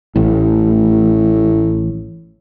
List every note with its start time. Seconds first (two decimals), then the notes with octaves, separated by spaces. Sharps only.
0.16 A1 A2